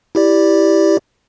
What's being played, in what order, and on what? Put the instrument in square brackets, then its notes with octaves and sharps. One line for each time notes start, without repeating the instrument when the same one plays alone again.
[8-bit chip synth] E4 G4 D5